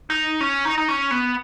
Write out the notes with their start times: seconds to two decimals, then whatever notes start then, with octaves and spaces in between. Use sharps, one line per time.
0.10 D#4
0.41 C#4
0.65 D#4
0.78 D#4
0.88 C#4
1.11 B3